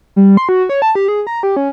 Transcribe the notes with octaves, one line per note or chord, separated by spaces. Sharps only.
G3
C6
F#4
C#5
A5
G4
G#4
A#5
G4
C#4